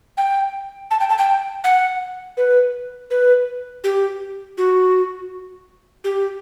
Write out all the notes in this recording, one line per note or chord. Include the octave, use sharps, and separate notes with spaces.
G5
A5
G5
A5
G5
F#5
B4
B4
G4
F#4
G4